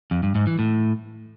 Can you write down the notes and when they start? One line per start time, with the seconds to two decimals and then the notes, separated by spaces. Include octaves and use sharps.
0.11 F2
0.23 G2
0.35 G#2
0.47 E3
0.59 A2